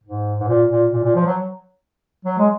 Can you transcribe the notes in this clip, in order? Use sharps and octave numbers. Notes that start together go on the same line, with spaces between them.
G#2
G#2
A#2
A#2
A#2
A#2
F3
F#3
F#3
G#3